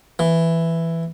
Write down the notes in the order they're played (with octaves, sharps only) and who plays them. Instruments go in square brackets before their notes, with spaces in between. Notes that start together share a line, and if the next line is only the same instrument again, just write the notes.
[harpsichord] E3